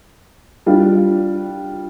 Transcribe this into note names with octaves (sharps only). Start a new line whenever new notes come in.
G3 D4 F4